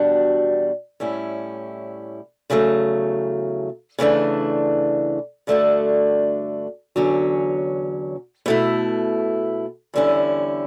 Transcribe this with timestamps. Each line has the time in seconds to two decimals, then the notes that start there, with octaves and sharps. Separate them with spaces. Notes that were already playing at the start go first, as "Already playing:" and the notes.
Already playing: E2 B2 G3 D4 F#4
1.00 A2 G3 C#4 E4
2.50 E2 C#3 F#3 A3
3.99 C#3 E3 A3 D4
5.47 G2 D3 A3 D4 F#4
6.96 E2 D3 F#3 C#4
8.46 B2 A3 E4
9.94 E2 D3 G3 C#4 E4